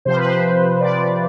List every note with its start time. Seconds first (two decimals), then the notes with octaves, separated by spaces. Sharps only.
0.05 C3 F3 C5
0.16 B4
0.25 C5
0.81 C3 F3 D5